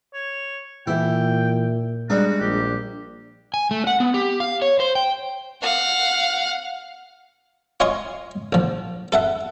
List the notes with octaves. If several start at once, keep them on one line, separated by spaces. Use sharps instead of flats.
C#5
A#2 E3 E4 E5 G5
G3 G#3 D4 D#4 F#4
A#1 G4
G#5
A3
F#5
B3
G4
F5
C#5
C5
G5
F5 F#5
F4 C#5 D#5 G#5 C6 C#6
A#1 F3
A4 E5 F#5